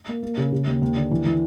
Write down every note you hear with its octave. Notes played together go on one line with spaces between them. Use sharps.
A#3
A#3
C#3
C#3
D#2
D#2
D3
E3
E3